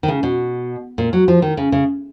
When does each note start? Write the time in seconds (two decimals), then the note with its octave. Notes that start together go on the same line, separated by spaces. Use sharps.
0.03 D#3
0.08 C#3
0.23 B2
0.98 A#2
1.13 F#3
1.28 F3
1.42 D#3
1.57 C#3
1.72 C#3